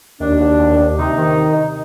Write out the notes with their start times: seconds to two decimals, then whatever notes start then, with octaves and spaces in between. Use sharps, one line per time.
0.20 D#2 D4
0.40 D#2
0.59 D#2
0.79 D#2
0.98 C3 D#4
1.18 D#3